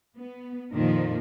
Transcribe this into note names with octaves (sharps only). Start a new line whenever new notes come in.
B3
F2 A#2 D#3 F3 A#4